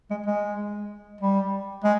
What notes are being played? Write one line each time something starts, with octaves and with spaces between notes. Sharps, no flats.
G#3
G#3
G3
G#3